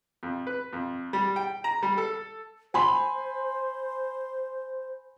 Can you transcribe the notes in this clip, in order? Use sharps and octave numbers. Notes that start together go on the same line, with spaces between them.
F2
B4
F2
G3
G5
A#5
G3
A4
C5 G#5 B5 C6